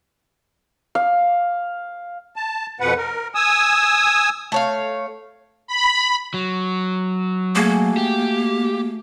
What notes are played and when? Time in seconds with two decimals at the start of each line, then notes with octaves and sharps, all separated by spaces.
0.95 F5
2.36 A5
2.80 F2 B2 B4 F#5
2.97 A#4
3.35 G#5 D#6 E6
4.52 A3 C#5 F5
5.67 B5
6.34 F#3
7.55 A3 A#3 F#4 G#4
7.97 G4